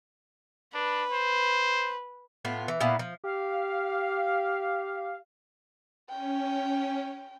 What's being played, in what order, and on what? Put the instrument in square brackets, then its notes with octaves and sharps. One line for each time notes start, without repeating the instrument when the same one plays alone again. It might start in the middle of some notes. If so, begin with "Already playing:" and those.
[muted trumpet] D4 [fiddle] B4
[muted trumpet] C5
[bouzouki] A2 B3 F4
E3
A#2 B3 E4 F5
F3
[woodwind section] G4 F5
[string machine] C#4 [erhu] G5